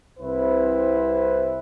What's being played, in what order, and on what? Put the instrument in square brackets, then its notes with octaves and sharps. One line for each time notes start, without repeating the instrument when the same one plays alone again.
[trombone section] C2 C4 E4 B4 C5